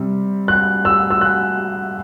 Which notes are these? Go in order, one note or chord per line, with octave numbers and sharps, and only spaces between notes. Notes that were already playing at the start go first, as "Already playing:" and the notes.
Already playing: C3 G3 C4
F#6
E6
E6
F#6